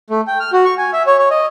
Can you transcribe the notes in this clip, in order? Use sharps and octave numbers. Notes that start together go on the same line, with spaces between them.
A3
G5
F6
F#4
C#6
G#5
E5
C#5
C#5
D#5